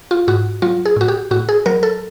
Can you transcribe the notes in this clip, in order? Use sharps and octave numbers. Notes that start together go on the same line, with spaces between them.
F4
G#2 F#4
F#3 F4
G#4
A2 F#4
G4
A2 F#4
G#4
F#3 A#4
A4